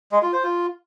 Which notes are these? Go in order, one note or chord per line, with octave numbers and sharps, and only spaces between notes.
G#3
F4
C5
F4